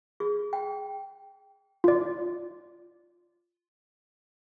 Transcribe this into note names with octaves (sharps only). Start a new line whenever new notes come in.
G#4
G5
F4 D5